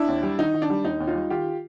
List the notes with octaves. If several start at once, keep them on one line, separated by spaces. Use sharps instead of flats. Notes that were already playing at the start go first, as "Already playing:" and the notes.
Already playing: D4 E4
D#2
G3
D#3 D#4
D#3
D4
G3
D#2 D#4
D#2
D#4 F4
G3
D#3 F4 G4